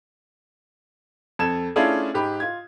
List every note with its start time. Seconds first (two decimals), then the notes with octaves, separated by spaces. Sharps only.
1.39 F2 A4 G#6 E7
1.76 A3 C#4 D4 E4 F4 G#4
2.14 G#2 G4 B5
2.40 F4 G#6